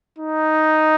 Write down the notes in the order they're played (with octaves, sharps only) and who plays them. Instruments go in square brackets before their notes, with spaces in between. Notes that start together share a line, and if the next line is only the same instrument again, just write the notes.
[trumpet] D#4